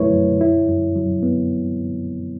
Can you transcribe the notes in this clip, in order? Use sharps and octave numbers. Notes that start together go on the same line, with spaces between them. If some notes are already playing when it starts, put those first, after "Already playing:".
Already playing: F#2 F#3 A3 E4 B4 C#5
F#2
E4
F#2
F#3
B3